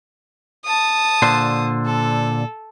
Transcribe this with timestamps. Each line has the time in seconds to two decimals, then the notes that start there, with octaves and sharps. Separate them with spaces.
0.65 A5 D#6
1.22 A#2 D3 C5
1.86 A4